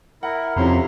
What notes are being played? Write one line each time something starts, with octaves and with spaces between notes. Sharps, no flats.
E4 A#4 F#5
F2 C3 C#4 E4 A#5 C6